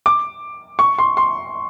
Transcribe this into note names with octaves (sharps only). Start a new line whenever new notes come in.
D6
C#6
C6
C6